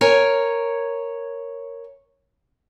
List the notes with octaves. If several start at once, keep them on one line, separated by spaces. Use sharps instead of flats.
A#4 C#5 G#5